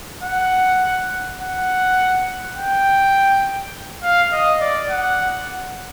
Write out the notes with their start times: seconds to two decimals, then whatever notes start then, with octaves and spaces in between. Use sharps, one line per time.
0.23 F#5
1.40 F#5
2.57 G5
4.03 F5
4.32 D#5
4.61 D5
4.90 F#5